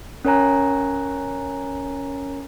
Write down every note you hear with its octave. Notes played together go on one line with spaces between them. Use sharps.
C#4 A#4 C#5 G#5 A#5 F#6